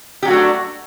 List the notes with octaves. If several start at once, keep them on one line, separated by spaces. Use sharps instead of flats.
F#3 A3 D4 F#4 G4